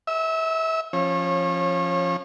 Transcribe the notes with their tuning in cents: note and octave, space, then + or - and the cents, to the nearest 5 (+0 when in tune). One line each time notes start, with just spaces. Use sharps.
E5 -30 E6 +0
F3 +0 C#4 -25 C#5 -35